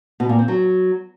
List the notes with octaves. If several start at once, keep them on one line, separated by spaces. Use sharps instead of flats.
B2
A#2
C4
F#3